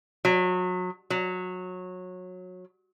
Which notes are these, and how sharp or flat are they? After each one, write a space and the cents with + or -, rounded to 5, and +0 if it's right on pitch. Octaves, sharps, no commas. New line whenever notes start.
F#3 -30
F#3 -20